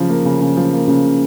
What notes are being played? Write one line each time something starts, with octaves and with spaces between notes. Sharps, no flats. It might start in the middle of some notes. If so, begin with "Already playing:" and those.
Already playing: C#3 F3
A#3
C#3
C#3
F3
A#3
C#3